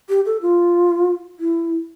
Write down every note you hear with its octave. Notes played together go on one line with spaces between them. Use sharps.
G4
A4
F4
E4